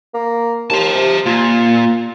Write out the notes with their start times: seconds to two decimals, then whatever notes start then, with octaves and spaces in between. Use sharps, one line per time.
0.14 A#3
0.70 D#2 C5 A5
0.95 C3
1.26 A#2 F4